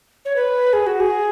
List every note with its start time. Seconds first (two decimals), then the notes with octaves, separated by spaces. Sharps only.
0.25 C#5
0.36 B4
0.73 G#4
0.87 F#4
1.00 G#4